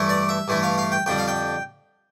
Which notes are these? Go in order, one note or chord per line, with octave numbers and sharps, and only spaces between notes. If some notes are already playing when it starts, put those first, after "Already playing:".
Already playing: G2 E3 A3 E4
D5
E5
G2 E3 A3 E4
F5
F5
G5
F2 D3 G3 G5
F5
G5